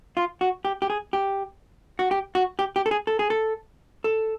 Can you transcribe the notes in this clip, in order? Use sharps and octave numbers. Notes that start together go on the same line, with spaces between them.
F4
F#4
G4
G4
G#4
G4
F#4
G4
F#4
G4
G4
A4
G#4
A4
G#4
A4
A4